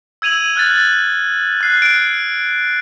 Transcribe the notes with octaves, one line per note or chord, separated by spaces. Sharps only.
E6 G#6 D#7 F7 F#7
F6 F#6 G#6 A6
F#6 C7
D7